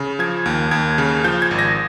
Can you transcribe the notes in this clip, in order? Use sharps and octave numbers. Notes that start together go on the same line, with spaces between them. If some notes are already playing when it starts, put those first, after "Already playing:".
Already playing: C#3
F3 G#6
D#2
D#2 G#6
C#3
F3 G6
G#6
G#1
A#6